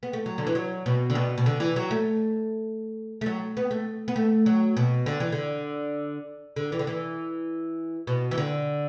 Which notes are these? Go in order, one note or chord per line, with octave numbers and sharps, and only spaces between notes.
B3
A3
F#3
D3
E3
F#3
B2
D3
B2
B2
D3
E3
F#3
A3
A3
F#3
B3
A3
B3
A3
F#3
B2
D3
E3
D3
D3
E3
D3
E3
B2
E3
D3